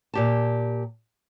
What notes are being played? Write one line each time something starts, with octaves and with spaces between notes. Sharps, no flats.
A#2 G4 A5